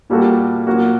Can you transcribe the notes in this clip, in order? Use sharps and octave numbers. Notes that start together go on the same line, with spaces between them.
A#2 G3 A#3 F#4 A4
A#2 F#3 A#3 F#4